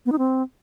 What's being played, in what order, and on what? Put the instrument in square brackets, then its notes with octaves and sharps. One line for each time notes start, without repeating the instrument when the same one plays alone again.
[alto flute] B3
D#4
C4